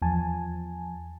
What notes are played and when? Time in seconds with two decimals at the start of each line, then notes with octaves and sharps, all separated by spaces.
0.02 E2 F3 G#5 A5